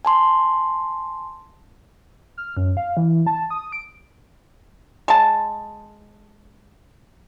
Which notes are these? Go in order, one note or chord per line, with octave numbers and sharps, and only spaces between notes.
G#5 A5 C6
F6
F#2
F5
E3
A5
D#6
D7
G#3 A5